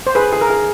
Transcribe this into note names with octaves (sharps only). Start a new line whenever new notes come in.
C5
G#4 B4
G#4
A#4
G#4